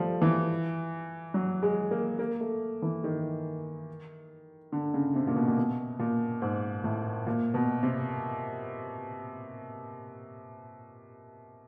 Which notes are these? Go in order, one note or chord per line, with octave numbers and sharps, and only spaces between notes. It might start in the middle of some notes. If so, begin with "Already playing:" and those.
Already playing: F3 G3 A3
E3
F#3
G#3
A#3
A#3
A3
E3
D#3
D3
C#3
C3
A#2
B2
A#2
B2
A#2
G#2
A2
A#2
B2
C3